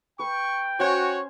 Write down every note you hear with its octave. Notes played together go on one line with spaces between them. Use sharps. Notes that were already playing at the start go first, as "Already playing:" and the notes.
B4 G5 C#6
C#4 F#4 C5 C#5 G#5